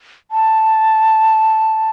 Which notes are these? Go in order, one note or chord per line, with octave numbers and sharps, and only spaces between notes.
A5